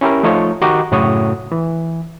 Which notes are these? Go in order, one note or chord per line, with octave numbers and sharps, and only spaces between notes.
C#4 E4 G4 A#4
F3 A3 D#4 F4 C#5
D#3 F#4 G4 D#5 A#5 D6
F#2 A2 C#3 F#4 C#5 D#6
E3